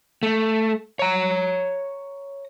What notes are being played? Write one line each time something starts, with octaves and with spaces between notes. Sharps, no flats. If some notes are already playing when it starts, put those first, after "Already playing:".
A3
C#5 A#5